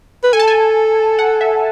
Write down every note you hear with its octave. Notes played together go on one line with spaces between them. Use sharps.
B4
A4 G#5
A5
G#5
F#5
E5